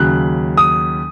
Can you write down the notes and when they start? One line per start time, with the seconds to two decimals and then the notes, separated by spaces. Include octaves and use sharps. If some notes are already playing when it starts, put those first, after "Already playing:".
Already playing: D#2 C#3 F#3 F#6
0.57 D#6